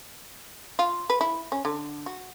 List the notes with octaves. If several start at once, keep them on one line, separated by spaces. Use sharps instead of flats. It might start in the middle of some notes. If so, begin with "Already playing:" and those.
F4
B4
E4
C#4
D3
F#4